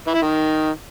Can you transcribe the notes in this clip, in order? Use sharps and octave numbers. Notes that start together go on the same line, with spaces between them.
E3
E4
D#3